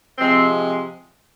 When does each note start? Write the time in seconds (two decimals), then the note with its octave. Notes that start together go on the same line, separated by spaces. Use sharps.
0.18 C3 F3 G#3 C4